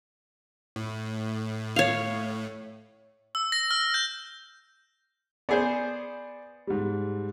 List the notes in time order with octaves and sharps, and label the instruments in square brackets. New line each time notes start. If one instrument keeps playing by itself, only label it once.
[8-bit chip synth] A2
[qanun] C#5 F5
[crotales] E6
A#6
F6
G6
[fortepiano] B3 G#4 C5 [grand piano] D5
[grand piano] G#2 G3